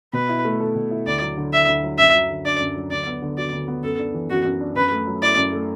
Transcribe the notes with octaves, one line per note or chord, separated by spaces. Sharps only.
B2 B4
E4
A3
A4
B2
E4
D2 D5
F#3
D3
D4 E5
D2
F#3
F#2 E5
F#3
D3
D4 D5
F#2
F#3
D2 D5
B3
D3
F#4 D5
D2
B3
F#2 A4
D4
E3
F#2 F#4
F#2
D4
F#2 B4
A3
F#3
E4 D5
F#2
A3